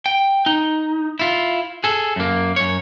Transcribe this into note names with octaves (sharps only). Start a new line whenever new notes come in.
G5
D#4
E4 F4
G#4 A4
F#2 A#3
F#2 C#5